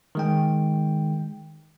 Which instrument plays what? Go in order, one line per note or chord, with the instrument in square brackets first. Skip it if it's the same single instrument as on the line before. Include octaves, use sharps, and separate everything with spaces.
[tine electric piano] D#3 G#3 G5